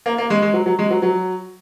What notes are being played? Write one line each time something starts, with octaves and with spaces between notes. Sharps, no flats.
A#3
A#3
G#3
G#3
F#3
F#3
G#3
F#3
F#3